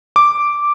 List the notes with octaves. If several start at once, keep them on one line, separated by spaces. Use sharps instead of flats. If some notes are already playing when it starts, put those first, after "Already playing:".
D6